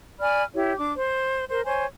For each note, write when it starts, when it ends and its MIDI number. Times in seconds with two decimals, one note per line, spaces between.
0.20 0.43 74
0.20 0.43 80
0.20 0.43 83
0.20 0.43 89
0.53 0.72 64
0.53 0.72 67
0.53 0.72 73
0.77 0.91 62
0.77 0.91 86
0.96 1.45 72
1.49 1.63 70
1.49 1.63 72
1.65 1.85 72
1.65 1.85 73
1.65 1.85 80